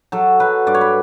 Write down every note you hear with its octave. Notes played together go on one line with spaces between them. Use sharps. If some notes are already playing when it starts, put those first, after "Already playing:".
F#3 A4
F#3 B4
G2 D5
C#5
B4